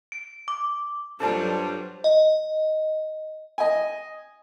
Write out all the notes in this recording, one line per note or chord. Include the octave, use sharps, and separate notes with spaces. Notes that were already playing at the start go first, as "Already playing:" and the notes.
D7
D6
G2 F#3 G3 F4 A4 C5 D5 A5
D#5
D#5 G#5